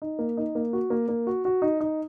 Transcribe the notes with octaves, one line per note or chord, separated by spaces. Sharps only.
D#4
A#3
D#4
A#3
F#4
A#3
A#3
F#4
F#4
D#4
D#4